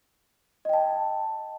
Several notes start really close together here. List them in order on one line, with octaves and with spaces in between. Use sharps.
D#5 G5 A5